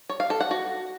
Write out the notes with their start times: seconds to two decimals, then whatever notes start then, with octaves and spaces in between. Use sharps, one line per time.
0.09 C#5
0.20 F5
0.30 A4
0.40 F#5
0.51 F#4